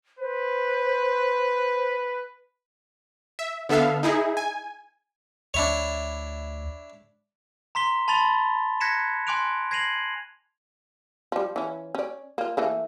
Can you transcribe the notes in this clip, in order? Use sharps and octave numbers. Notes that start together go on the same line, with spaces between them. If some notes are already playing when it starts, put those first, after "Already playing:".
B4 C5
E5
D3 B3 A4 E5 F5
D#4 E4 G#4
G#5
D2 D4 E4 C#5
A#5 C6 B6 G7
A5 B5 C6 A6 F7 G7
F#6 G#6 A#6 B6 C#7 E7
G#5 C6 D6 F#6 D7 F7
G#6 A#6 C7 D#7 F7 F#7
F3 G3
E3 C#4
C#4 D5
A#3 F4
E3 A3 A#3